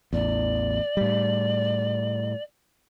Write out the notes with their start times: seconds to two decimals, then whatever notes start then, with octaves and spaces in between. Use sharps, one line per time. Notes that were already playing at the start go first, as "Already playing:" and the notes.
0.13 A1 E2 D5
0.97 A2 G3